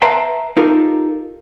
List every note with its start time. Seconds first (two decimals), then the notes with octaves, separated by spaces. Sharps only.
0.02 B4 E5 F5 A5 A#5 C6
0.57 D#4 F4 G4 A4 A#4